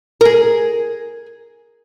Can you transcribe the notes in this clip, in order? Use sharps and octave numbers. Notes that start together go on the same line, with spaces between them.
G#4 A#4